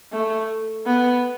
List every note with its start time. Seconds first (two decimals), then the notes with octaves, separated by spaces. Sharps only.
0.12 A3
0.86 B3